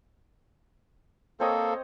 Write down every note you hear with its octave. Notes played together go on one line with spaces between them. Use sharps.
A#3 C4 A4 C#5 D#5